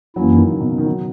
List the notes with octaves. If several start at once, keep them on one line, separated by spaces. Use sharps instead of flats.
F#2 E3 F#3 A#3 C#4 E4
D#3
C#3
B2
C#3
D#3
F#3